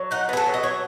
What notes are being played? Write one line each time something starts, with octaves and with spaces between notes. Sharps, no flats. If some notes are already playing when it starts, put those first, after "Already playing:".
Already playing: F#3
D#4 F#5
B3 G#4
A4
F#3
D#5
F#3 C#5